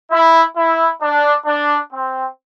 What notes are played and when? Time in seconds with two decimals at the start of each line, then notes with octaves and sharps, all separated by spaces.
0.11 E4
0.56 E4
1.01 D4
1.46 D4
1.92 C4